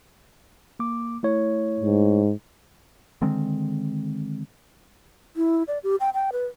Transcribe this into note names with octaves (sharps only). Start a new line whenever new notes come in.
A#3 D6
A3 E4 C#5
G#2
D3 D#3 G#3 C4
E4
D5
G4
G5
G5
B4